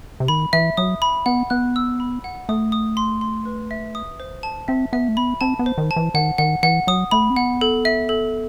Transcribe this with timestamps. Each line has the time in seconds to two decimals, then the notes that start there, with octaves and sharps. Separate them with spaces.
0.20 C3
0.28 D#3 B5
0.53 E3 E5
0.77 F#3 D#6
1.02 B5
1.26 B3 F#5
1.50 B3 F#6
1.76 E6
2.00 B5
2.24 F#5
2.49 A3 D#6
2.72 D#6
2.97 C6
3.21 C6
3.46 B4
3.71 E5
3.95 D#6
4.20 C5
4.43 A5
4.68 C4 E5
4.93 B3 E5
5.08 A3
5.17 B3 B5
5.41 C4 A5
5.59 B3
5.66 C5
5.78 D#3
5.91 A5
5.96 E3
6.14 D#3 F#5
6.38 D#3 F#5
6.63 E3 F#5
6.87 F#3 D#6
7.11 A3 B5
7.30 C4
7.36 B3 F#5
7.61 A4
7.85 E5
8.09 A4